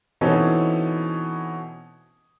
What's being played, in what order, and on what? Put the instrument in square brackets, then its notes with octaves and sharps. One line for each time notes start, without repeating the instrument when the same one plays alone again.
[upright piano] B2 E3 C4 C#4 D#4 A4